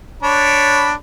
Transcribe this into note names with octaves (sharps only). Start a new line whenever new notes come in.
D4 C#5 B5